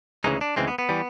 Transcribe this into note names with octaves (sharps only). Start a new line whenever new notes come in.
D2 C#3 E3 G#3 D#4
D4
D2 C#3 E3 G#3 C4
B3
B3
E3 G3